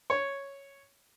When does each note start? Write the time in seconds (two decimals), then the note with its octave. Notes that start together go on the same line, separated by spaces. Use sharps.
0.10 C#5